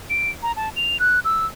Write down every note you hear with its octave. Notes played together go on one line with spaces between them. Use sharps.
D7
A#5
A5
F7
F#6
E6